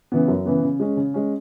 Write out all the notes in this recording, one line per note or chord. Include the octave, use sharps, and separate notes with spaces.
C#3 E3 B3
F#2
C#3 E3 B3
C#3
G#3 C#4
C#3
G#3 C#4